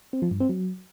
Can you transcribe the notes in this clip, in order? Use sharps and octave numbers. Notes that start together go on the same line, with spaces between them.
C4
F3
G2
C4
F#3